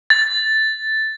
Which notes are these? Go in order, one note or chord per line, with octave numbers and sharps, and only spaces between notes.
A6